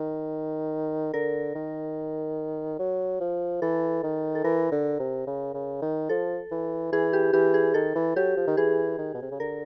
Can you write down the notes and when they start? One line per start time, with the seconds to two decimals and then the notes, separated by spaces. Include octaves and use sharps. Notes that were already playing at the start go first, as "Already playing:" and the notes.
Already playing: D#3
1.13 D3 A#4
1.55 D#3
2.79 F#3
3.20 F3
3.62 E3 A4
4.03 D#3
4.35 A4
4.44 E3 A#4
4.72 D3
4.99 C3
5.27 C#3
5.54 C#3
5.82 D#3
6.09 F3 A4
6.51 E3
6.92 E3 G#4
7.13 G4
7.33 E3 G4
7.54 G#4
7.74 D#3 A4
7.95 E3
8.16 F#3 G4
8.37 F3
8.47 D#3
8.57 E3 G#4
8.98 D#3
9.14 B2
9.22 C3
9.31 C#3
9.40 D3 A#4